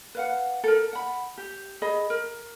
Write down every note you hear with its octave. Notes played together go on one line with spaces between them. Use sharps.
B4 F5 F#5
A4 A#4
F#5 B5
G4
G#4 D#5 B5
A#4